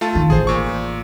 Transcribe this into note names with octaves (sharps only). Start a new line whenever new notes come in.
A3 F4 A5
D#3
A1 G#4 C5
A#2 C#6